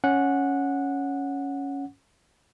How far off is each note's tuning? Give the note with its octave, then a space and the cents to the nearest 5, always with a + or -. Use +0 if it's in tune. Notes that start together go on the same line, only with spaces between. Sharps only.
C#4 +0 F#5 -10